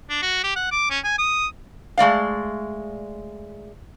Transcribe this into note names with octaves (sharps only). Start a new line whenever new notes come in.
D4
F#4
G4
F#5
D6
C#4
G#5
D#6
G#3 A3 D5 F5